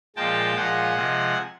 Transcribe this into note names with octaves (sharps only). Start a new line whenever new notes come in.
A#2 F3 G#3 G5 A5
A#2 F3 G#3 F#5 G#5
C3 F3 G#3